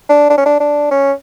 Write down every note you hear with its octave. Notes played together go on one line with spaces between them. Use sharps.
D4
D4
C#4
D4
D4
C#4